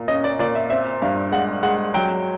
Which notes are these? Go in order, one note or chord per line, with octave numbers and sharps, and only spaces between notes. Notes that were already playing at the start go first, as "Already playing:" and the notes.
Already playing: A#2
C#4 D#5
D5
A#2 D5
E5
C4 E5
G2 F5
G#3 F#5
G#3 F#5
F#3 G5